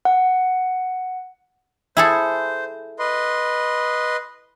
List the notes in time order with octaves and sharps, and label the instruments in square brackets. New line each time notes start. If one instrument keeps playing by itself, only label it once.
[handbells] F#5
[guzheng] E4 G#4 A4 [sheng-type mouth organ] C5
[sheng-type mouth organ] B4 D#5 C6